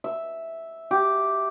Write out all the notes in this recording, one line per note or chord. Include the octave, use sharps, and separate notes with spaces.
E5
G4